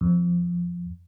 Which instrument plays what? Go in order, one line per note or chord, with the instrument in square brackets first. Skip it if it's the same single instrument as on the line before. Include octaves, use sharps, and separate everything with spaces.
[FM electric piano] F2